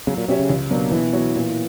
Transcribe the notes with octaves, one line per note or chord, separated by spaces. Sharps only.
C#3 F#3
A#2
B2 C#4 G4 C#5 E5
C#3
C#2
B2 F#3 A#3 D4
B2 E3
F#3 B3 F#4 C#5
A#2